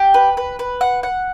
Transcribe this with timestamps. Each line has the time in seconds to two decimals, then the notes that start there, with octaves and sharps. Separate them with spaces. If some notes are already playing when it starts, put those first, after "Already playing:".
Already playing: G4
0.14 B4
0.37 B4
0.59 B4
0.81 F#5
1.03 F#5